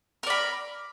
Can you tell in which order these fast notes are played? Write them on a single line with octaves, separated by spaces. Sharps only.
A#4 D5 B5